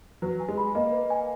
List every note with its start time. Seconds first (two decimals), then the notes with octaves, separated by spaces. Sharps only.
0.22 F#3 B4
0.40 G#5
0.49 G#3
0.58 B5
0.75 A#3 D#5
0.92 B4
1.10 G#5